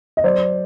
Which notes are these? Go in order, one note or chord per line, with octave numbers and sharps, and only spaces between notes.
D#5
F#3 C5 D5